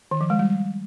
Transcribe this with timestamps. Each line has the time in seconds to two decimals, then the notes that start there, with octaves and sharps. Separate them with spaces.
0.11 D#3
0.21 F3
0.30 G#3
0.39 G3